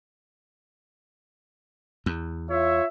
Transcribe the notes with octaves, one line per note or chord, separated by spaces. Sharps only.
E2
F4 C#5 E5